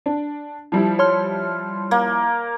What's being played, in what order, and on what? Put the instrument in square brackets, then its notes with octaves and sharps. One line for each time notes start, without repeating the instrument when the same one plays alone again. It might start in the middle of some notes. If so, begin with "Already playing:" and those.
[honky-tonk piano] D4
F3 G3 E4
[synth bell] C#5 C6 F6
[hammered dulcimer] A#3